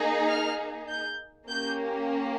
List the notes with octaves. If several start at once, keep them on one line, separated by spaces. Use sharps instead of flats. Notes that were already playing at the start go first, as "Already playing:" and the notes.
Already playing: A#3 D#4 G#4
F6
G6
A#3 C#4 G4 G6